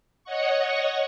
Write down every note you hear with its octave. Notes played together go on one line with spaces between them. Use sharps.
C#5 D#5 F#5 C#6